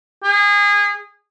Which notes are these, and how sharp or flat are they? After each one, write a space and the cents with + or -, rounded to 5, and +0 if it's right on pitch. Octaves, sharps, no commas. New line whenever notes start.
G#4 -25